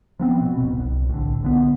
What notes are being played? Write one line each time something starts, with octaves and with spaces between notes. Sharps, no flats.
F3 B3 C4
B2
D1 G#1 B2
C2
A1 D3
B1 D3 B3